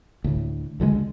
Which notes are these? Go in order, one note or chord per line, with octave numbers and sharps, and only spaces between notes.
D2 A2
C#2 D3 E3 G#3